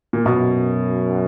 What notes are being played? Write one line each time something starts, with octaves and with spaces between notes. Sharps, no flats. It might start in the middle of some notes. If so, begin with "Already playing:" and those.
A#2
F#2 B2